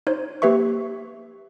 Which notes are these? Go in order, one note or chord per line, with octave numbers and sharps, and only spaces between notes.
D#4 C5 C#5
A#3 G4 B4 E5 C#6